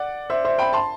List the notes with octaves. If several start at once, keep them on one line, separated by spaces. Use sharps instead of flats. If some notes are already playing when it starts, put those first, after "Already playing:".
Already playing: D5 F#5
C5 E5
C5 E5
G5 B5
A5 C6